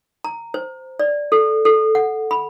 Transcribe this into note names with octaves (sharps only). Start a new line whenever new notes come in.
A#5
C5
D5
A4
A4
F#5
B5